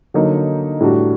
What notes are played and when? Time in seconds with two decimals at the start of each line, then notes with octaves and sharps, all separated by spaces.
0.14 D3 F#3 A#3 D#4
0.81 A2 G3 D4 F#4